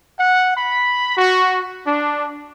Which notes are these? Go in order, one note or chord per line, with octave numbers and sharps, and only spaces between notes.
F#5
B5
F#4
D4